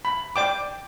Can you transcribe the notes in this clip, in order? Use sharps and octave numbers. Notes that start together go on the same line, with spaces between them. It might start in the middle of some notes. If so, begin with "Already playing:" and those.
B5
D5 G5 D6